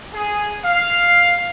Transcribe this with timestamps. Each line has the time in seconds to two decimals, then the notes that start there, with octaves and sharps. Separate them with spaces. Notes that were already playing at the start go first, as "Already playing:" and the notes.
0.14 G#4
0.64 F5